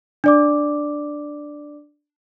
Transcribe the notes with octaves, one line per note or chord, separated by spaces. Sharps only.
D4 D5 D6